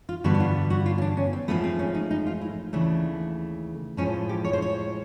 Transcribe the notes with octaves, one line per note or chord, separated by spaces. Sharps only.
F4
G2 D3 G3 B3 F#4
F#4
F4
F#4
F4
C#4
D4
C#4
C4
G#2 F3 A3 B3
C4
C#4
D#4
D#4
F4
E4
D#2 C#3 E3 A3 D4
A2 F3 G#3 C#4
G4
C#5
C5
C#5